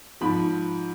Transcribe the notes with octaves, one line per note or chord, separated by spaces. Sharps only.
G#2 F3 B5